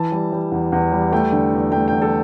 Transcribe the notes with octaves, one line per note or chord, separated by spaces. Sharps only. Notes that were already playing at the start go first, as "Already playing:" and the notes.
Already playing: E3 A5
G3
G3
E2
E2
G3
A3 G5
D3
E2
A3 G5
E2 G5
A4